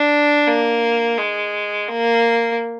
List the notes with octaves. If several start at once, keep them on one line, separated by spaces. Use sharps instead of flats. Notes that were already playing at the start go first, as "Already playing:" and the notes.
Already playing: D4
A#3
G#3
A#3